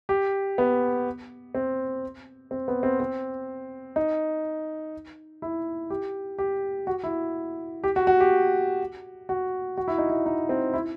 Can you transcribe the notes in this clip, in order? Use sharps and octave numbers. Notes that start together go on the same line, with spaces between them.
G4
B3
C4
C4
B3
C4
C4
D#4
E4
G4
G4
F#4
E4
G4
F#4
F#4
G4
F#4
F#4
E4
D#4
E4
D#4
C4
E4